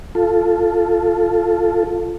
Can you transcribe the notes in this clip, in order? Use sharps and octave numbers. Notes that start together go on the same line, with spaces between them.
F4 A4